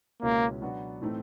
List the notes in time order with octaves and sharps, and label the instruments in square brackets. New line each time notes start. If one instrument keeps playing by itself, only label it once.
[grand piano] C#2 B2 G#3 C#4 E4 [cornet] A#3
[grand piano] B2 F#3 B3 D4 F#4
A2 E3 A3 C4 D#4